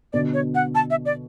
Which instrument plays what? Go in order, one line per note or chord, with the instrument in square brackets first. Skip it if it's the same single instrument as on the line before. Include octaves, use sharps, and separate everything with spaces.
[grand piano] B2 D3 [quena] D5
[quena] C#5
F#5
A5
E5
D5